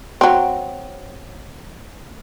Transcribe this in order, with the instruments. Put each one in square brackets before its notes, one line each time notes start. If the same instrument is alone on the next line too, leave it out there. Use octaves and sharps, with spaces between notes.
[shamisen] F#3 C4